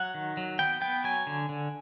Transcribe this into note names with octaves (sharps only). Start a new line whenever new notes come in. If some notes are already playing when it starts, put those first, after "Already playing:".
Already playing: F#3 F#5
D#3
F#3
B3 G5
B3 G5
F#3 G#5
D3
D3